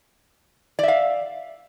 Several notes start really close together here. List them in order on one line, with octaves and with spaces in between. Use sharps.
D5 E5 F5